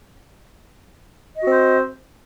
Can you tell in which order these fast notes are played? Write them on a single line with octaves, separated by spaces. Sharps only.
D#5 F#4 C4 C5